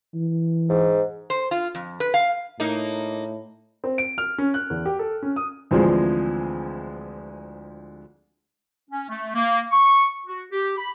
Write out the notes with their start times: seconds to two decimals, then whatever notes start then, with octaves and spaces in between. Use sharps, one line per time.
0.15 E3
0.70 G#2
1.30 C5
1.51 F4
1.75 F2
2.00 B4
2.14 F5
2.60 A2 A#3 D#4
3.84 C4
3.98 D7
4.18 F6
4.38 C#4
4.54 F#6
4.70 E2
4.86 G4
4.99 A4
5.23 C#4
5.36 D#6
5.71 D2 E3 F3 G#3 C4
8.90 C#4
9.09 A3
9.35 A#3
9.71 C#6
10.26 F#4
10.52 G4
10.77 B5